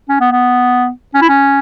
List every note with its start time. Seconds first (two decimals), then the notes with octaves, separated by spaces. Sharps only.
0.09 C#4
0.20 B3
0.32 B3
1.14 C#4
1.22 E4
1.29 C#4